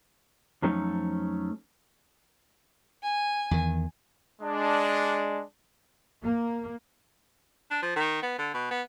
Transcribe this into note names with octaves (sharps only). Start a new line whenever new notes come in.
F2 F3 F#3 A3 C#4 D#4
G#5
E2 D#3
G#3 D4
A#3
D4
F3
D#3
B3
D3
B2
B3